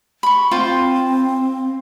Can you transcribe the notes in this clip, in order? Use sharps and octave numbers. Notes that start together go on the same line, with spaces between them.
B5 C#6
C4 F4 C5 G5